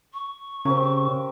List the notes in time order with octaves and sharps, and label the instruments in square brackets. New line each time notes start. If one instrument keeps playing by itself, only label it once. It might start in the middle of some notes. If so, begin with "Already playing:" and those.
[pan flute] C#6
[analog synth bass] C#3 [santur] C4 G4 A#4